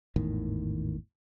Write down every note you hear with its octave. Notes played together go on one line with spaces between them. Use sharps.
G#1 E2 A2 D#3